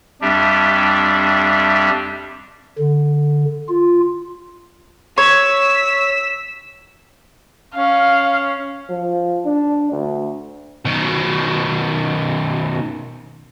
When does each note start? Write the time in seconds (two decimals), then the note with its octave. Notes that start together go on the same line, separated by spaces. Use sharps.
0.22 F2 G3 D4 G4 E5
2.78 D3
3.68 F4
5.18 C#5 E6 B6
7.75 C#4 F5
8.90 F3
9.45 D4
9.91 D2
10.85 B2 D#3